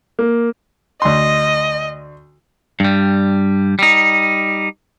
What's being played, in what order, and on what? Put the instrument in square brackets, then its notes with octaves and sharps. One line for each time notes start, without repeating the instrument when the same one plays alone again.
[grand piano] A#3
[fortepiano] D2 C6 [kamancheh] D#5
[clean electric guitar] G2 G3
G3 D#4